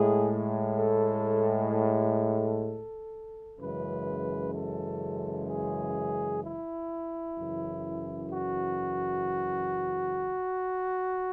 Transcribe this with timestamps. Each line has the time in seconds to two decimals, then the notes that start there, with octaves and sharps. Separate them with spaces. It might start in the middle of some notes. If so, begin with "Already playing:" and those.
Already playing: A2 G#3 G#4
0.76 A4
1.71 A4
3.60 F#2 C#3 E3 G#3 B4
4.54 A4
5.48 G#4
6.43 E4
7.37 F#2 C#3 E3
8.31 F#4